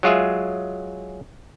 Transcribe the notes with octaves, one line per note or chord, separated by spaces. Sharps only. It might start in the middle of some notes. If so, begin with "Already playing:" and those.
F#3 G#3 F4 G#4 E5